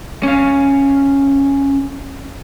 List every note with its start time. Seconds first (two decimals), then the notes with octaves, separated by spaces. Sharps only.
0.23 C#4 F5